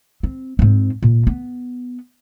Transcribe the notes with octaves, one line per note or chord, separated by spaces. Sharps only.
C4
G#2 C4
A#2
B3